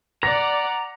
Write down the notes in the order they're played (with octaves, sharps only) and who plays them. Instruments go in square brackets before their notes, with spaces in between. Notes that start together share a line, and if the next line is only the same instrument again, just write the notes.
[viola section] D5 F#5 [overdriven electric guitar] A#5 [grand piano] A#6